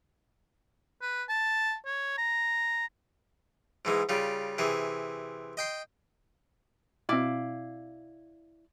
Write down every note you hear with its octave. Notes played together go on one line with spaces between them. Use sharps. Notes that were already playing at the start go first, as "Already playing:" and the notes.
B4
A5
C#5
A#5
G#2 E3 G#3
C#3 G3 F4
C3 E3 G#4
D#5 G5 C6
B2 C4 E4 D5 F5